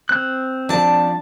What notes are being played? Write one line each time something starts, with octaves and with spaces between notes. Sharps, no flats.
C4 F#6
F3 D4 A5